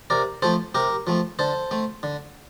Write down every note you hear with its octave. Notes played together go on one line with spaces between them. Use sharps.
C3 A#4 D5
F3 A3 C4 A4 C5
C3 G4 A#4
F3 A3 C4
D3 A4 C5
A3 C4
D3